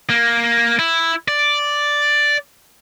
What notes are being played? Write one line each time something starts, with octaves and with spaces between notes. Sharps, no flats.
A#3
E4
D5